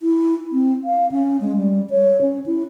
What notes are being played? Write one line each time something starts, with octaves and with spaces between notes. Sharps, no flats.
E4
C4
F5
C#4
G#3
G3
C#5
C#4
E4